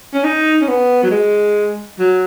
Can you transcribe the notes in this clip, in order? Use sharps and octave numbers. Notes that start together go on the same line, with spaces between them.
C#4
D#4
C#4
B3
F#3
G#3
F#3